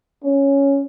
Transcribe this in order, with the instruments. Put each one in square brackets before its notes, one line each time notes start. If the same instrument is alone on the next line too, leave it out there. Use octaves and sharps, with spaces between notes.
[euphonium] C#4